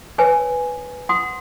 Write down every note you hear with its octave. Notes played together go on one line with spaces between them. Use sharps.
A#4 B4 C#5 G#5
F#5 C6 D#6